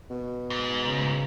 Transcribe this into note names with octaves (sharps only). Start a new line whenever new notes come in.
B2
G#2
C#3